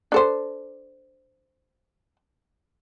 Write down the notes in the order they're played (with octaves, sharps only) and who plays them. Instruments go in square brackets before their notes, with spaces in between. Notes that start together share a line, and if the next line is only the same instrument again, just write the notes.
[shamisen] D4 A4 C5